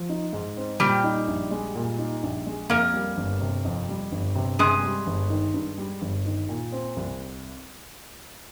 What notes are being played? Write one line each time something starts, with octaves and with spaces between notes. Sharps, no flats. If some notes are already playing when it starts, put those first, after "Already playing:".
Already playing: F3
D#4
G#2
C4
A#2 G3 G4
D#4
A#1
G#3
A#2
D#4
A#1
G#3
F2 A#3 A#4
G3
G1
C3
F2
G3
G1
C3
G2 G#3 G#4
G3
G1
D#3
G2
G3
G1
D#3
A#2
C4
C2